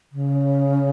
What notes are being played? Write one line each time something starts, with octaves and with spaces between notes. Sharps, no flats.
C#3